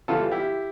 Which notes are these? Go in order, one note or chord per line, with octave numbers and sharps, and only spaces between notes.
C#3 E3 G3 F4 A4
E4 G4